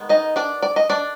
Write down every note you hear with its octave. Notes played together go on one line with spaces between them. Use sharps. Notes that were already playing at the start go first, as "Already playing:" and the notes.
Already playing: D#3 G#3 B3
D#4 D#5
D4 D5
D5
D#5
D4 D5